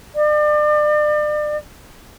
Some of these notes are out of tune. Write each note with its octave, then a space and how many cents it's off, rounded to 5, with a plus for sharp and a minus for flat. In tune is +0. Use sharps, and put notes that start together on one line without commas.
D5 +35